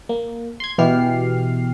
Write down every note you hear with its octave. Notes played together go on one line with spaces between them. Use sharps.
A#3
C6 G#6
B2 E3 G4 F6 C7